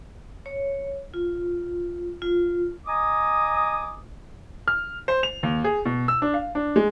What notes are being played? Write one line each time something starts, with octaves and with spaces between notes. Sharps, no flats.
C#5
F4
F4
D#5 G#5 A#5 D6 D#6
F6
C5
F7
D#2
G#4
B2
E6
D4
F5
D4
G#3